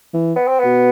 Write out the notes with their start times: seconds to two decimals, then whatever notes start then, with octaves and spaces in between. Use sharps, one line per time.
0.14 E3
0.36 B3
0.48 C4
0.59 B3
0.64 B2